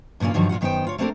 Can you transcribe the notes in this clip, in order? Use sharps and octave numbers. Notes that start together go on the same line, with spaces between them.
G2 A#2 C#3 A#3 F4
G2 D3 D#3 F3 F#3
A#2 D#3 F4 F#5
F#2 D#3 B3 G4 C5 G5
D2 F4 C#5
A3 A#3 C4 D4 A4 A#4